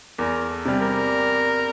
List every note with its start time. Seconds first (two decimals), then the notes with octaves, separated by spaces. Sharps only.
0.18 E2 A#4
0.50 A4
0.65 C3 G3
0.81 A#4